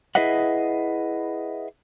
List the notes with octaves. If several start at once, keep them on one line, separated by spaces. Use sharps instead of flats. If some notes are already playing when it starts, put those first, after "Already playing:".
E4 G#4 B4 D#5 E5 F#5